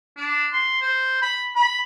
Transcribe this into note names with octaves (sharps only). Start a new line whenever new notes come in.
D4
C6
C5
B5
B5